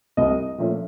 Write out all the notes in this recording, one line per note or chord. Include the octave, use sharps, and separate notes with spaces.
C2 D#5
A#2 F3 A3 C#4